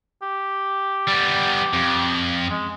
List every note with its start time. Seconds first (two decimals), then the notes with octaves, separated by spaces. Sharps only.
0.22 G4
1.08 G3 B3
1.73 F2
2.50 G#3